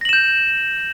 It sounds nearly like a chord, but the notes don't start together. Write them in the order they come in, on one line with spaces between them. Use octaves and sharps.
A#6 F#7 E7 G6